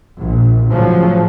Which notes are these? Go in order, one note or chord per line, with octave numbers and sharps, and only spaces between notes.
A#1 A#2
A2 C#3 F3 F#3